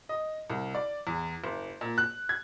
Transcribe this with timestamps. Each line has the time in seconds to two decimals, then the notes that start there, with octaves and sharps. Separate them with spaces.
0.09 D#5
0.50 C2
0.75 D5
1.07 E2
1.44 F#1
1.81 A#2
1.98 F#6
2.29 G#6